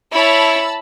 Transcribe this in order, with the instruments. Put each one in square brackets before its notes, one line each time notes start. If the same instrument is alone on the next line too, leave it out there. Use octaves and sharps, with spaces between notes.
[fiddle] E4 C#5 [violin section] A5 B5 E6